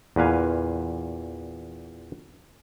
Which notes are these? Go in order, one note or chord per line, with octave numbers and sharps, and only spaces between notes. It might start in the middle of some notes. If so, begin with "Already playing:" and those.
E2 A#2 B4 F5 G#5